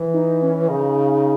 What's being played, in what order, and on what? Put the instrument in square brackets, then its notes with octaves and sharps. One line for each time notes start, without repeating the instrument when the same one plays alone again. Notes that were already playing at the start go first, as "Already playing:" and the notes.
Already playing: [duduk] E3
[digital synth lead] D#4
C#4
[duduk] C#3 [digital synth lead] D#4